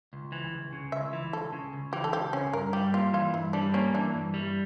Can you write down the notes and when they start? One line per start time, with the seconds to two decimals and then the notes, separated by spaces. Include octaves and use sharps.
0.13 C#2
0.32 E3
0.53 C#2
0.73 C#3
0.92 C#2 E5
1.13 E3
1.33 C#2 A4
1.53 C#3
1.73 C#2
1.93 E3 G4
2.04 A4
2.13 C#2 G4
2.33 C#3 C#4
2.53 G2 A#4
2.73 G3 G4
2.93 A#3 F4
3.13 E3 F4
3.34 G2 E4
3.53 G3 D4
3.74 A#3 C#4
3.94 E3 D4
4.14 G2
4.34 G3